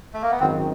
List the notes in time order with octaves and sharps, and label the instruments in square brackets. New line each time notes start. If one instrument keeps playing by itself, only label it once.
[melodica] A3
A#3
B3
[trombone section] G#1 F#2 D#3 [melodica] C4